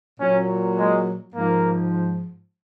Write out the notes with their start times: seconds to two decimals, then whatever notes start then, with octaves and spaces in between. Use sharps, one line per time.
0.20 A#2 F#3 C#4
0.78 G#3
1.34 G#2 F3 A#3